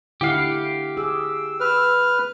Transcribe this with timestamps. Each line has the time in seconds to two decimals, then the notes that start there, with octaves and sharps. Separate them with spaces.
0.21 D3 E4 G4 F5 F#5
0.97 G#4 E6
1.60 B4 F6